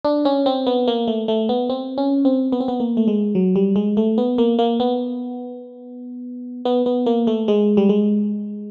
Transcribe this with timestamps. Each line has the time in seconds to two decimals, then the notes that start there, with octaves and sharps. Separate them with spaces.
0.05 D4
0.25 C#4
0.46 C4
0.67 B3
0.88 A#3
1.08 A3
1.28 A3
1.49 B3
1.70 C4
1.98 C#4
2.25 C4
2.52 B3
2.60 C4
2.68 B3
2.80 A#3
2.97 A3
3.08 G#3
3.35 F#3
3.56 G3
3.76 G#3
3.97 A3
4.18 B3
4.38 A#3
4.59 A#3
4.80 B3
6.65 B3
6.86 B3
7.06 A#3
7.27 A3
7.48 G#3
7.77 G3
7.89 G#3